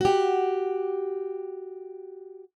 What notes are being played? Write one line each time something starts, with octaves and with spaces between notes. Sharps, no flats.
F#4 G4